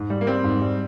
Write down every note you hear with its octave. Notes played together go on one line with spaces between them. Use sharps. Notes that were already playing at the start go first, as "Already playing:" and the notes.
Already playing: G#2
G3
A#3
G3 C4
G#2
G3